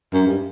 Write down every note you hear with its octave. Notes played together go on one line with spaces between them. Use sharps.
F#2
G2